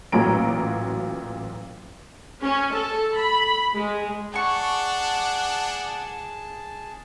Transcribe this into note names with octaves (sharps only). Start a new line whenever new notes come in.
A1 A#2 F#3 A#5 D7
C#4
A4
B5
G#3
D4 G#4 F#5 G#5 A5 C#6